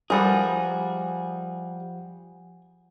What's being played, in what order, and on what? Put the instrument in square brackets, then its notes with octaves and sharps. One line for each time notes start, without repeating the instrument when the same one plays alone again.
[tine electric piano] F3 F4 F#5 [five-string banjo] G3 A#4 [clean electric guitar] G#4